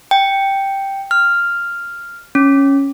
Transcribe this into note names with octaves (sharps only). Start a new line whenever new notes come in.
G5
F6
C#4